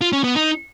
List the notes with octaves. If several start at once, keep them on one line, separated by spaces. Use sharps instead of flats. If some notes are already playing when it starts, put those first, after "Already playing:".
F4
C#4
B3
D#4